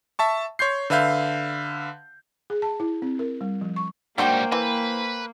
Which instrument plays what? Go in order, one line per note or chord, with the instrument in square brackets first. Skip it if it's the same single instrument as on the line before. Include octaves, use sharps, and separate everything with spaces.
[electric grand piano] E5 A5 C#6
C#5 C6 G6 C7
D3 B4 E5 F5 G6
[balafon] G#4
A5
E4
C4
A#4
G3
F3
C#6
[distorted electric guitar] G#2 G3 [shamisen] F#3 D4 F#4 [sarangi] A#3 [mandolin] C5 G5
[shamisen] E3 [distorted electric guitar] B4